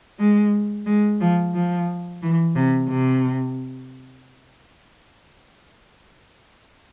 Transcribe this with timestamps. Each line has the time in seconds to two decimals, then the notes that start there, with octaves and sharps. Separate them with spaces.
0.19 G#3
0.86 G#3
1.21 F3
1.54 F3
2.22 E3
2.55 C3
2.89 C3